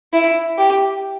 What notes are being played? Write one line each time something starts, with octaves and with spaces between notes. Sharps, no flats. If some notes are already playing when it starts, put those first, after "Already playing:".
E4
G4